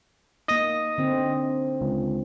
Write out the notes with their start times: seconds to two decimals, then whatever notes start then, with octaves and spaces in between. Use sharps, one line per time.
0.48 A#3 D#4 D#5 D#6 A#6
0.98 D3 C4
1.81 C#2